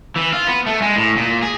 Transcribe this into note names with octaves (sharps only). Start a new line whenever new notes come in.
E3
F4
B3
A3
G#3
A2
A#2
G#4